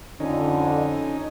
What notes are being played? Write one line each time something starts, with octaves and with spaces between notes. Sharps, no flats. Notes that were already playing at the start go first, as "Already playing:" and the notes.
F2 D3 C#4 D#4